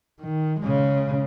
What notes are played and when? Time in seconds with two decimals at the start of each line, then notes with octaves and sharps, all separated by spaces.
0.21 D#3
0.60 C#3 G#3